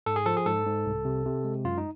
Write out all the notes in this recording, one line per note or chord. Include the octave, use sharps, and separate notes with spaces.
G#2 A4
G#4
F3 A4
G#4
G#2 A4
G#2
C2
C3
C3
G#3
F#2 F4
D#4